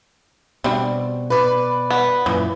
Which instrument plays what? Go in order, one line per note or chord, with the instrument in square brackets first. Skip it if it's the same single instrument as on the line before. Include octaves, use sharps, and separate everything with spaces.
[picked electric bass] B2 [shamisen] G3 C4 D4
[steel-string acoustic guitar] B4 D5
[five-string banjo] B3
[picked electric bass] F#2 A#2 [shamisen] E3